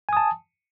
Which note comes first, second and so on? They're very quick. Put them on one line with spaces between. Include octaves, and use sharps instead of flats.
G#5 D#6 A5